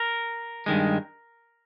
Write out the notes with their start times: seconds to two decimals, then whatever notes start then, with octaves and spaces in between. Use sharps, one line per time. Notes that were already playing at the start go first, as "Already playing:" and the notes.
Already playing: A#4
0.66 G2 D#3 G#3